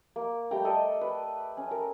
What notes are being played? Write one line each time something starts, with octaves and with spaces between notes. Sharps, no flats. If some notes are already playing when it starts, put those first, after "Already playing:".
A#3
G3 A3 G5 A#5
A4 D5 D#5
B4
C#4
A#4